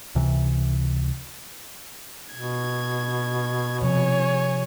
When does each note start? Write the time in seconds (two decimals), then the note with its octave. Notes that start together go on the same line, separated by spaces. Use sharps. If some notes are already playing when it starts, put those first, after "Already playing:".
0.15 C#2 C3 E3
2.34 B2 G#6
3.82 C3 F3 C#5 G#5